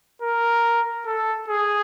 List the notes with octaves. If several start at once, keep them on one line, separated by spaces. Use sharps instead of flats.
A#4
A4
G#4